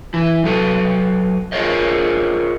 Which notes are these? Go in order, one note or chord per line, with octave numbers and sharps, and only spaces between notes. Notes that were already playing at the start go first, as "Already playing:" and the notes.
E3 E4
F#3 A4 B4
F4 G#4 A#4 C5 C#5 D#5